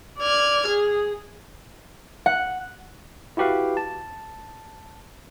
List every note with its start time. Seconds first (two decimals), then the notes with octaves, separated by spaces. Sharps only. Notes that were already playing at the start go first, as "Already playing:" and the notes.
0.20 D5 F6 G#6
0.67 G#4
2.26 F#5
3.37 E4 F#4 G4 B4 F5
3.77 A5